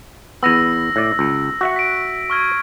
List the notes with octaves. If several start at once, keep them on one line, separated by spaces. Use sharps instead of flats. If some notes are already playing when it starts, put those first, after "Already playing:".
E2 B3 E6 A#6
A2 D5
C#2
F#4 E5 F#5
B6 D7
C#6 F6 G#6